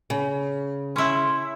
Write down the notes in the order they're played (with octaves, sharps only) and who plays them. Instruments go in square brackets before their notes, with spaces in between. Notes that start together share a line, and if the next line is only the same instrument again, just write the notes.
[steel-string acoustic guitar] C#3
[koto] C#4 E4 [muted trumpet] C6